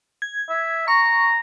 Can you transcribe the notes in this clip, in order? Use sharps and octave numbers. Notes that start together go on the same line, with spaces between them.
G#6
E5
A#5 C#6